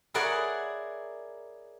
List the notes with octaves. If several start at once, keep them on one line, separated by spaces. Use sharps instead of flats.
E4 G#4 A#4 C#5 D5 F#5